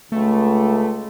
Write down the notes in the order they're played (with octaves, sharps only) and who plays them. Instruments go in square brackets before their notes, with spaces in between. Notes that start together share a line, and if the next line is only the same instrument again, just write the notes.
[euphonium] C#2 [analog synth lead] A3